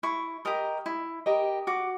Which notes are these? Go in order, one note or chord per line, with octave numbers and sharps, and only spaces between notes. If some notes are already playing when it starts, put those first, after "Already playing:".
E4 C#6
G4 A#4 D#5
E4
G4 A#4 D#5
F#4 D6